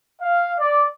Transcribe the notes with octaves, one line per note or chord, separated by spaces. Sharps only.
F5
D5